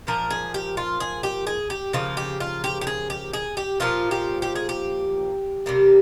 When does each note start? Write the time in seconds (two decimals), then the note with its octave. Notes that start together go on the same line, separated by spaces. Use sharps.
0.07 A#2 F3 A#3 A#4
0.30 G#4
0.54 G4
0.77 F4
1.00 G#4
1.23 G4
1.47 G#4
1.70 G4
1.93 C#3 F3 A#3 F4
2.17 G4
2.40 F4
2.64 G4
2.81 G4
2.87 G#4
3.10 G4
3.33 G#4
3.57 G4
3.80 A#2 F3 A#3 F4
4.11 G4
4.42 G4
4.55 G#4
4.69 G4
5.66 C3 G3 A#3